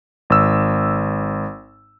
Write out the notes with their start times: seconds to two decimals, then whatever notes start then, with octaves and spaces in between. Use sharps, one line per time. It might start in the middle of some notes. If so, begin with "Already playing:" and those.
0.30 G#1 E6